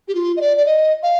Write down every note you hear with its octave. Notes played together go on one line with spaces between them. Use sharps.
G4
F4
D#5
D5
D5
D#5
F5